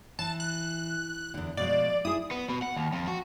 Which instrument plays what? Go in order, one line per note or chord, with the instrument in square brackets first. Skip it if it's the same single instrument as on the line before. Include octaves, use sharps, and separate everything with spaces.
[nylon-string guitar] E3 [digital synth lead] A5
[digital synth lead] F#6
[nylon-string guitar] E2 D3
[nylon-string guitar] B2 F3 G#3 [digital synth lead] D5
[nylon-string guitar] E4 G#4 [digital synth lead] D#6
[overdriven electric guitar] B3
B2
F#5
D#2
F2
F#4